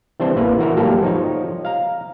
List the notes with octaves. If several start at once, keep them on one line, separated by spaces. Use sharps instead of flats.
E3 G3 C4 D4 C5
A1 E3 A#3 B4
E3 F#4 A#4
G#2 F#3 G3 A#3 G4 A4
F3 D#4 C#5
F5 A#5